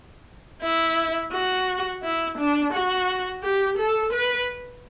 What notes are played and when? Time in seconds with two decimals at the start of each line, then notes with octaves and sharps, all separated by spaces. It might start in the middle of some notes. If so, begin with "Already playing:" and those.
0.63 E4
1.33 F#4
2.03 E4
2.38 D4
2.73 F#4
3.43 G4
3.78 A4
4.13 B4